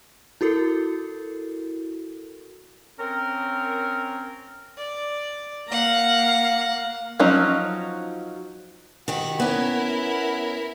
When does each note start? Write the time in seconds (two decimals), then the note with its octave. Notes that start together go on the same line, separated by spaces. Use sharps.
0.41 E4 F#4 A4 A#4
2.98 C4 C#4 A#4
4.78 D5
5.68 A#3 F5 F#5 A#5
7.19 F3 F#3 C#4 D#4
9.08 D#3 F#4 G4 F#5
9.40 B3 C#4 E4 A#4